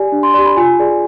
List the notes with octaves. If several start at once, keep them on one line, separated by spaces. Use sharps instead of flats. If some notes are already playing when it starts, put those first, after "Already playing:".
Already playing: G4 D5 G#5
D4
C6
G4 D5 C6
B5
F4 G#5
G#4 D5